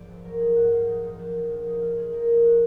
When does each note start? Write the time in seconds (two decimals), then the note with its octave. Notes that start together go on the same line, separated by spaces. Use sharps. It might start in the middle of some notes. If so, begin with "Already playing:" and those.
Already playing: G#2 F3 B4 D5
0.09 F2
0.24 F#3 A#4
0.40 F#3 G#4
0.56 G#2 F#4
0.71 F3 F4
0.87 F3 D#4
1.03 A#2 D#4
1.19 F3 D4
1.35 F3
1.50 A#2
1.66 F3 D#4
1.81 F3 F4
1.97 A#2 G#4
2.13 F3 A#4
2.28 F3 G#4
2.45 F#4